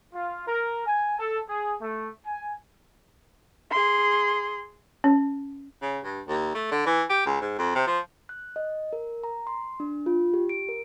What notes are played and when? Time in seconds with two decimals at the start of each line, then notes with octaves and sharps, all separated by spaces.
0.13 F4
0.47 A#4
0.86 G#5
1.18 A4
1.48 G#4
1.81 A3
2.25 G#5
3.71 G#4 C6
5.04 C#4
5.82 C#3
6.04 G2
6.28 D#2
6.55 A3
6.71 D3
6.86 E3
7.10 G4
7.26 C#2
7.41 G#2
7.58 F2
7.75 C3
7.87 F3
8.29 F#6
8.56 D#5
8.93 A#4
9.24 A#5
9.47 C6
9.80 D4
10.06 F4
10.34 G4
10.49 D7
10.69 A#4